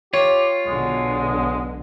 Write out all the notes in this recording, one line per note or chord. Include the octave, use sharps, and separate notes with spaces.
F4 G4 C#5
B1 B2 D3 G#3